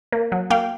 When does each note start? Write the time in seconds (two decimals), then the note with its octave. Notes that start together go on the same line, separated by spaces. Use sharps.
0.12 A#3
0.32 F#3
0.50 A#3 F5 G5